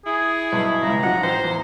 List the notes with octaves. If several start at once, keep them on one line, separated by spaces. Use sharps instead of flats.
E4 G#4
B1 G2 B4
C#2 C#3 A#5
F3 F#3 D#4 F#5
A1 C5
E2